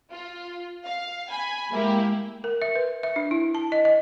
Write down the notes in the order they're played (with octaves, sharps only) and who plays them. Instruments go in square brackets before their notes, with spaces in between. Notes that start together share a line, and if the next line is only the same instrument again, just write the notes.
[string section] F4
F5
G#5 B5
G#3 A#3 E4 G4
[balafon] A#4
E5
B4
E5
D4
E4
A5
D#5
D#5